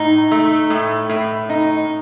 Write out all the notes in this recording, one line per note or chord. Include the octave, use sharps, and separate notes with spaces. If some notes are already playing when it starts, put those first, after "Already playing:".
Already playing: A2 D#4
A3
A2
A2
D#4